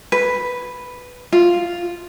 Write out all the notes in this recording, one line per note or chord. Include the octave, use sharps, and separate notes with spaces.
B4
F4